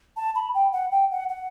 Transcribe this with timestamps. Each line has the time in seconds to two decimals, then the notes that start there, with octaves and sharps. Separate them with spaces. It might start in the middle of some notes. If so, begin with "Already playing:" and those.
0.17 A5
0.35 B5
0.54 G5
0.73 F#5
0.92 G5
1.11 F#5
1.29 F#5